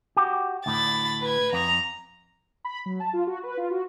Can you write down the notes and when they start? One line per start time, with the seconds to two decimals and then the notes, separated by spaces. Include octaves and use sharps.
0.17 F#4 G4
0.66 D2 A2 B5 A6
1.21 B4 G#6
1.53 F2 A#5 F7
2.65 B5
2.86 F#3
3.00 A5
3.13 F4
3.27 F#4
3.43 B4
3.57 F4
3.71 F#4